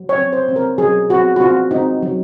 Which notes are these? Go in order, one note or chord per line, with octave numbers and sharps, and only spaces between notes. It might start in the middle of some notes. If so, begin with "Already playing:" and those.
Already playing: F#3
C#5
C4
C5
C4
A#4
F#3 G#4
C4 F#4
F#4
C4 F4
C4 D#4
F#3